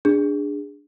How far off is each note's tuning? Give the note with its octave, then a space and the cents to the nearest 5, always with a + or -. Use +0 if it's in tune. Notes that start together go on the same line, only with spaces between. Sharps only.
D4 +0 G#4 -20